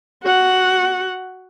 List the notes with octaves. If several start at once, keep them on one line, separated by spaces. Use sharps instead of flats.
F#4 F#5